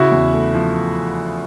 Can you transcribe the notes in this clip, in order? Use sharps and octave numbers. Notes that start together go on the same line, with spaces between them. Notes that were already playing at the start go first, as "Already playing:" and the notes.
Already playing: C#3 E4 F#4
E2
A3
F3